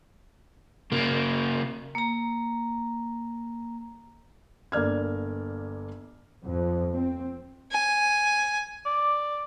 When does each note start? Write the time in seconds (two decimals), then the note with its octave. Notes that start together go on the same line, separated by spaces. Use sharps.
0.92 C#3 A#3
1.95 A#3 A#5
4.72 G1 A#3 D5 F6 G#6
6.45 F2
6.94 C4
7.71 G#5
8.86 D5